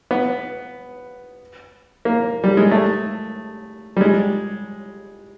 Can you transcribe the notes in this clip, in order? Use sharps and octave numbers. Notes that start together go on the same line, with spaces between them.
B3
A#3
G3
G#3
A3
G3
G#3